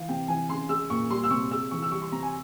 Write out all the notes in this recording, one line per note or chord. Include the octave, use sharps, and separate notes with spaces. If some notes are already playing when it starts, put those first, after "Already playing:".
Already playing: E3 F5
C3 G5
E3 G#5
C#3 C6
G#3 E6
A#2 C#6
G3 C6
E6
C3 C#6
G#3 E6
E3 C#6
E6
G3 C#6
C6
C3 A#5
G#5